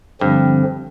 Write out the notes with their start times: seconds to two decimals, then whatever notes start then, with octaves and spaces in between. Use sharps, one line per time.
0.21 G2 D3 F3 C4